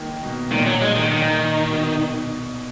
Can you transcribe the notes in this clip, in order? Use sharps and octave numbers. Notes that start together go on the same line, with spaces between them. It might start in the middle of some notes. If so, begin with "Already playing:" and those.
Already playing: D#3 A#3
B2
A#2 D#3
F#3
G#3
D#3
A#2 D#3
B2